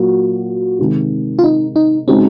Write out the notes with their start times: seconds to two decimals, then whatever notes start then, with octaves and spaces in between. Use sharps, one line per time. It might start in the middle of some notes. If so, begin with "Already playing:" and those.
Already playing: A#2 F#3 A#3 F#4
0.79 C3 D#3 G#3
1.39 F4
1.44 D#4
1.76 D#4
2.08 C#3 G#3 C4 D#4 F#4